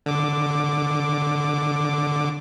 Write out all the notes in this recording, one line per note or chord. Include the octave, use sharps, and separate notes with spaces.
D3 D6